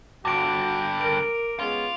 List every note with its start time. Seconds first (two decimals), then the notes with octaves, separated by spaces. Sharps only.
0.25 G2 D3 F#4 D6 D7
1.01 A#4 D7
1.59 G#3 B3 C#4 F5 C6